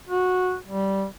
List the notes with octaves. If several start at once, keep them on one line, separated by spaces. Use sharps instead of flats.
F#4
G3